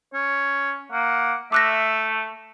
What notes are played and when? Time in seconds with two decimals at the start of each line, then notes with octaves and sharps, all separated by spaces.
0.14 C#4 C#5
0.92 A#3 F#5
1.52 A3 E5 D6 F#6 A#6